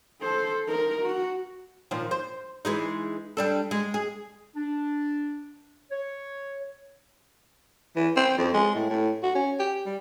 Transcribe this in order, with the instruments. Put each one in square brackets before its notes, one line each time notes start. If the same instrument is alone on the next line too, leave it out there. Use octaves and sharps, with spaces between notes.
[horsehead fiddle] A4 C5
D#4 A#4
F#4
[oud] A#2 D#3 F3
C5
E3 G#3 D#4
G3 D4 A4
G#3
G#4
[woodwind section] D4
C#5
[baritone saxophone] E3
C4
F2
G#3
A2
A2
F#4
C#4
G4
G3